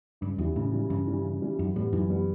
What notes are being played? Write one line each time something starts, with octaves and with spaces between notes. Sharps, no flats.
G2 C#3
E2 E3 G3
A2 C#3
E3 G3
G2 C#3
E3 G3
C#3
E3 G3
F#2 E3
A2 G3 B3
F#2 E3
G3 B3